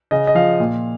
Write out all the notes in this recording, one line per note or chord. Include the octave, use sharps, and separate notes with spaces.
C#3 D#5
D#5
F3 F5
A#2